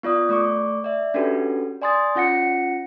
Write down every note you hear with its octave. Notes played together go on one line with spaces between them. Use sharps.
B3 F4 D5 D#6
A3 D5 C#6 D6
D5 E5
C#4 D4 F#4 G4 A4 B4
D5 G#5 C6 D#6 A6
C#4 F4 F#5 A#6 C#7